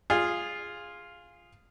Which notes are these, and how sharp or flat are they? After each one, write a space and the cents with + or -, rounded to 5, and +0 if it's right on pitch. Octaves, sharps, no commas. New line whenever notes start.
F4 +0 G#4 -10